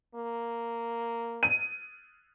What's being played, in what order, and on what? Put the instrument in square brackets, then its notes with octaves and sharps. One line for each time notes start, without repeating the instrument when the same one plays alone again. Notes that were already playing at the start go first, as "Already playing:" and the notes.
[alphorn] A#3
[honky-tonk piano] D#7